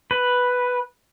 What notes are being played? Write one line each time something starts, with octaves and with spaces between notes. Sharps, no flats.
B4